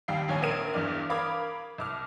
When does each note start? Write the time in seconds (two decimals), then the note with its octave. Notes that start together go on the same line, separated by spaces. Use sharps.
0.08 D#2 G3 F5 G5 C7
0.28 A#1 D#2 C#5 G#5
0.42 A#1 A#4 D#6 G#6 D#7
0.73 E2 G2 D5 F6
1.10 A#4 F5 B5 D6 D#6 G#6
1.78 C2 D6 F6